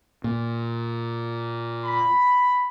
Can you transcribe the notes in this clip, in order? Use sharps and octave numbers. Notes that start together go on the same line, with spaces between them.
A#2
B5